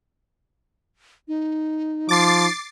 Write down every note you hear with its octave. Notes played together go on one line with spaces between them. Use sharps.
D#4
F3 D6 A6 C7